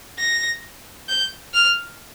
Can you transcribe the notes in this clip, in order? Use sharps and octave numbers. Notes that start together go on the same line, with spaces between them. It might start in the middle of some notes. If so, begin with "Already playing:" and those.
A#6
G6
F6